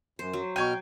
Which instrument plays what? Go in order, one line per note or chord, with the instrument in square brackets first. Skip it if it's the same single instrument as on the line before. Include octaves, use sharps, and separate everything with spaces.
[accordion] F#2 [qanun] C5
[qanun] F#3
[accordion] B2 F6 [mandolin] G5 [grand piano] C#6 G#6 D#7